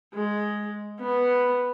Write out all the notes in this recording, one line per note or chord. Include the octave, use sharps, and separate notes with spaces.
G#3
B3